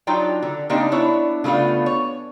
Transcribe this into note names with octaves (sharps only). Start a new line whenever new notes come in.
F#3 D4 D#4 F4 G5
D3
C#3 A#3 C4 D4 D#4 G4
B3 D4 E4 C#5
C#3 A3 B3 D4 F4
C#5